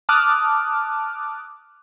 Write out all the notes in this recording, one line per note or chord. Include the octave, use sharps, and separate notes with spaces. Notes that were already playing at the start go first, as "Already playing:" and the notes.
A5 D6 D#6 F6 F#6